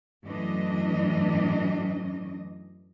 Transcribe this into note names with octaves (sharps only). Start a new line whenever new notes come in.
F#2 A2 E3 D4 D#5